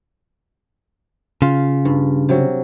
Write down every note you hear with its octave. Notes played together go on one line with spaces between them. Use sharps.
C#3 F4
G2
C3 F#3